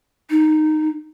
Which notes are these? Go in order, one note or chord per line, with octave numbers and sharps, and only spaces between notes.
D#4